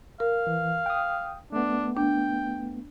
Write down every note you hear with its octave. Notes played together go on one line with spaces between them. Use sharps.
A#4 F5
E3
G5 D#6
A3 B3 D4
D4 G5